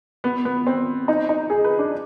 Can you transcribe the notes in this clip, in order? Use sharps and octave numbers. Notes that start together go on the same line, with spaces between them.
B3
B3
C4
D#4
D#4
G#4
B4
D4